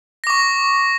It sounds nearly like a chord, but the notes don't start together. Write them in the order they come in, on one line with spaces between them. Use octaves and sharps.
A#6 D6 C#6